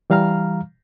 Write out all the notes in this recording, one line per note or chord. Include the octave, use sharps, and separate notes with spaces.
E3 G3 F5 A#5 F6